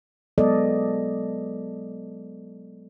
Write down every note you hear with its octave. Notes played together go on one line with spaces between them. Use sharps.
F#3 G#3 B3 A4 D5 D#5